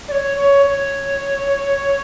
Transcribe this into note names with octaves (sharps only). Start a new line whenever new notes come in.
D5
C#5
C#5
C#5